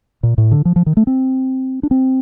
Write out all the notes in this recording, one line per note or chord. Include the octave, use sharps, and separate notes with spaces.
A#2
A2
D3
F3
F3
D#3
A3
C4
D4
C4